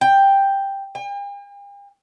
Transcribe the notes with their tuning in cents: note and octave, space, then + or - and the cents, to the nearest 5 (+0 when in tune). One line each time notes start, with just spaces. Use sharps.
G5 +5
G5 +45